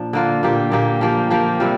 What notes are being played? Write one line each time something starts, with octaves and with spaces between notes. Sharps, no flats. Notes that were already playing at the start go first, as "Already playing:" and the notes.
Already playing: A#2 F3 D4
D3 A#3 F4
A#2 A#3 G4
A#2 A#3 G4
F3 A#3 G4
F3 A#3 G4
C3 G3 C4 F4